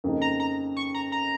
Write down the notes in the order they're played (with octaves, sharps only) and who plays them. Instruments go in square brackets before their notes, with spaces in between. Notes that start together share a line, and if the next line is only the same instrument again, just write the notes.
[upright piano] F2 C#3 A#3 D#4
[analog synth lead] A#5
A#5
C#6
A#5
A#5